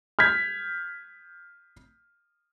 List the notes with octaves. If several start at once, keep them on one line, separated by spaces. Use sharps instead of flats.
F6 G6 G#6 B6